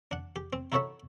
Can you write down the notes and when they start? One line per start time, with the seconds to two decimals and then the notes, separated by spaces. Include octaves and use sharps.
0.11 D4 F#5
0.36 G4
0.53 C4
0.72 D#4 E4 F#4 A4 C#5 E5